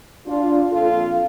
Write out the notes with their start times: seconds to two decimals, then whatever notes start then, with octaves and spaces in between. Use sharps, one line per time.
0.26 D4 F4
0.71 A#2 F3 C4 F4 A4